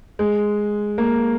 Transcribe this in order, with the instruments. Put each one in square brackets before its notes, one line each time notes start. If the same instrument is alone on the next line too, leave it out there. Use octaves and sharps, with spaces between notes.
[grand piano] G#3
A#3